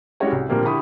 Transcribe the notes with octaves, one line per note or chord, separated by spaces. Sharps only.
G3 G#3 C#4 E4 F#4 C#5
C2
A#2 D3 F3 G3 A#3 C4
D3 E4 G4 B5 C#6 D#6